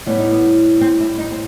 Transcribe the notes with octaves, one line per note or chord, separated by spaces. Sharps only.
A2 G3 B3
D#4
B3
C4
E4
D#4
C4